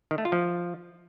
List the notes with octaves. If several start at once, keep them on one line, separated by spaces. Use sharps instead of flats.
D#3
A3
F4
F3